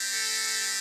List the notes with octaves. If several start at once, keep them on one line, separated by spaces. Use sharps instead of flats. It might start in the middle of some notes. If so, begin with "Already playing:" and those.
Already playing: G3 C4 G4
A4